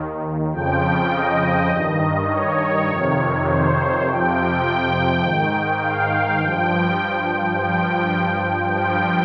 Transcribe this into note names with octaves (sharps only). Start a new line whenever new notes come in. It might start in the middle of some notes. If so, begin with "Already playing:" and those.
Already playing: D#2 D#3
F2 C#3 F3 G5
D#5
G2 D#3
C#5
F2 C3 D#3
C5
F2 C3 F3 G5
G5
G#2 D#3
F5
G2 F3 G5
G2 F3 G5
G2 F3 G5